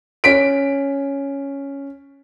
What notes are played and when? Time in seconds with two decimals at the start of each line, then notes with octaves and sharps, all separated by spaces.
0.24 C#4 B6 D7